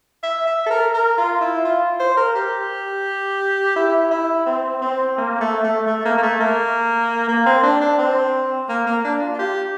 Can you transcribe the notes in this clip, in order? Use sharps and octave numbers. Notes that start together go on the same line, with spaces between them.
E5
E5
A4
A#4
A#4
F4
E4
F4
C5
A#4
G4
E4
E4
C4
C4
A#3
A3
A3
A3
A#3
A#3
A3
A#3
A#3
C4
D4
D4
C4
A#3
A#3
D4
F4
F4
G4